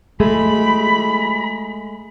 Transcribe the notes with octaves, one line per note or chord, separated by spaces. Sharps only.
G#3 A3 G#4 B5